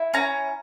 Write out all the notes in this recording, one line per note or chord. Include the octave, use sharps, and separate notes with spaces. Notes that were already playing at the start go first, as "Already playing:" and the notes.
Already playing: E4
C#4 A#5